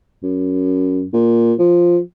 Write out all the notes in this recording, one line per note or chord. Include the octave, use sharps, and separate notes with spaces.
F#2
A#2
F3